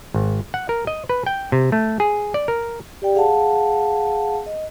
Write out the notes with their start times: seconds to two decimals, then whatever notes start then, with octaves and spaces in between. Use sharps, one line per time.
0.14 G#1
0.54 F#5
0.69 A#4
0.87 D#5
1.09 B4
1.26 G5
1.52 C3
1.72 A3
2.00 G#4
2.34 D5
2.48 A#4
3.02 G4 D5 G5
3.15 G#4 F5 F#5 A5
4.46 D#5